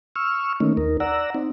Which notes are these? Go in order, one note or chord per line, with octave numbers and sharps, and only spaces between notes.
C#6 E6 F6
D#3 A3 A#3 C#4 D#4
D#2 D#4 A#4
D5 F#5 A#5 E6
C4 D#4